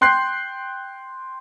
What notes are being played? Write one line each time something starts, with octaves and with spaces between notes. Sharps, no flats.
G5 C6 F#6 G6 C7